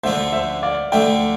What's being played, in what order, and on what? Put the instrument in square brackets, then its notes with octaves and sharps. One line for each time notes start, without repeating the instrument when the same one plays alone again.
[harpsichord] D2 D3 F3 A3 D4 [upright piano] C5 E5
[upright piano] C5 E5
D5 F5
[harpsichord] D2 D3 F3 A3 D4 [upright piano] E5 G5